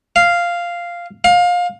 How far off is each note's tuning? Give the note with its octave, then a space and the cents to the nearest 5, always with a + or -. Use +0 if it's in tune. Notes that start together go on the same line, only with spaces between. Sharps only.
F5 -5
F5 +25